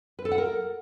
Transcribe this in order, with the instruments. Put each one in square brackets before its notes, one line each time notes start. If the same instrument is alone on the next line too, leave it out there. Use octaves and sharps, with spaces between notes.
[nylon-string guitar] B4
A4
F#5
A#4